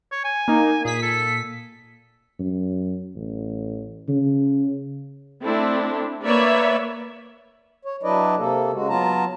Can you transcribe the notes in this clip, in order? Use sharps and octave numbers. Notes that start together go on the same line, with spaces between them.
C#5
G#5
A#3 D#4
A#2 G#4 B6
A4
F#2
A1
C#3
A3 C4 D4 E4
A#3 B4 C#5 D5 E5
C#5
F#3 D4 E4 B4 D5 D#5
C3 A#3 A4
C#3 G#3 F#4
F#3 B3 F4 A5 A#5